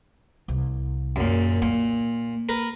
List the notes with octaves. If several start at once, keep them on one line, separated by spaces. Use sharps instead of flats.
C2
F#2 A#2
A#2 A#3
A#4 B4